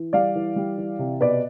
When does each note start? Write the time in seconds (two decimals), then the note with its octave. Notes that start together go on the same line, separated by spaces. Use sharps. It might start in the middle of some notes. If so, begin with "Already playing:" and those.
Already playing: E3
0.13 G3 D5 F5
0.35 E3
0.56 G3
0.78 E3
0.99 C3
1.21 B2 B4 D5